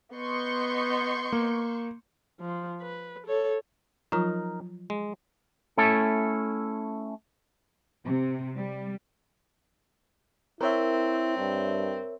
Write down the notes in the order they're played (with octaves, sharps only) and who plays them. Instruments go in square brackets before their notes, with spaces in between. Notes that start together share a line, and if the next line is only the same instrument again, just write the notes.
[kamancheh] B3 D#5 [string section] C6 C#6 G6
[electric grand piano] A#3
[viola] F3
B4
A4 C#5
[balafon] F3 F#3 F4 [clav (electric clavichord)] D#4 A#4
[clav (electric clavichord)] G#3
[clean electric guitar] A3 C#4 E4 A4
[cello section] C3
G3
[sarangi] C4 [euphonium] E4 [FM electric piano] A#4 C#5 E5
[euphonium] G2